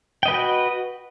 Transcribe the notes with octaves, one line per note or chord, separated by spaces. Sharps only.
F#4 B4 D#5 G5